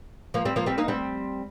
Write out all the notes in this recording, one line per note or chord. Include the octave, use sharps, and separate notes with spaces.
F3 A#3
G3 C4
F3 A#3
G3 C4
A#3 D#4
G3 C4